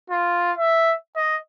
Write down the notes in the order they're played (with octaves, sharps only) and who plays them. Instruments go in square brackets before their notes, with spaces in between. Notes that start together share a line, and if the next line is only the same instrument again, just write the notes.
[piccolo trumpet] F4
E5
D#5